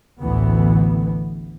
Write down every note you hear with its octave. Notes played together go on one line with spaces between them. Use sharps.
A1 D2 E3 B3